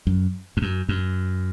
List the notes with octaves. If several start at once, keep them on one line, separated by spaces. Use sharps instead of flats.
F#2
F2
F#2
F#2